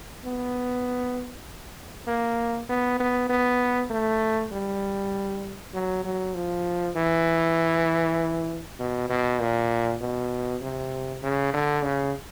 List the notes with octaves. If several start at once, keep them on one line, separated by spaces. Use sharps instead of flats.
B3
A#3
B3
B3
B3
A3
G3
F#3
F#3
F3
E3
B2
B2
A#2
B2
C3
C#3
D3
C#3